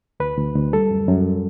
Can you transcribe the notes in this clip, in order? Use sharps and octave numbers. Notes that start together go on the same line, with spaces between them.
D2 B4
D2
D2
G3 A4
F#2
F#2